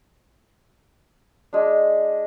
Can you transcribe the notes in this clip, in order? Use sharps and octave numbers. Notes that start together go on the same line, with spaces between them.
G#3 D4